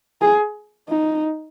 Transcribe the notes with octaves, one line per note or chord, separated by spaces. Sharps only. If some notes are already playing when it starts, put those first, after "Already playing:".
G#4
D#4